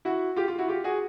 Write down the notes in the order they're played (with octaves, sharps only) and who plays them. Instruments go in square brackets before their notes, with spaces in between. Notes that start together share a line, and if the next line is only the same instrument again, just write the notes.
[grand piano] E4 F#4
F4 G4
F4
E4 F#4
F4 G4
F#4 G#4